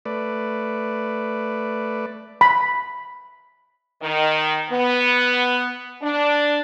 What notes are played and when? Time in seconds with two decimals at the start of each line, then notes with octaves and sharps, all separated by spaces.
0.06 A3 B4 D5
2.41 B5
4.02 D#3
4.70 B3
6.02 D4